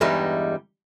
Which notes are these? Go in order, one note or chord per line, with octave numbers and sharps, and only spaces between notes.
E2 G2 E3 G3 G#3 D#4